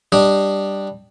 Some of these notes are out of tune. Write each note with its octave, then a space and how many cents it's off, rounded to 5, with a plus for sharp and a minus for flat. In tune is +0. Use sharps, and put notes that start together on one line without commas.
G3 +0 D4 +0 D#5 -5